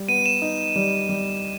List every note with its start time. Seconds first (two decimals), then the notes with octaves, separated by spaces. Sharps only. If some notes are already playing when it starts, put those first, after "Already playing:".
Already playing: G3
0.08 B3 D#7
0.26 E7
0.42 D#4
0.76 G3
1.09 G3